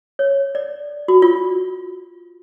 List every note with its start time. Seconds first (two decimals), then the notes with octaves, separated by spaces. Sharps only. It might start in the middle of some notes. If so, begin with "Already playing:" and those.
0.19 C#5
0.55 D5
1.08 F#4
1.22 F4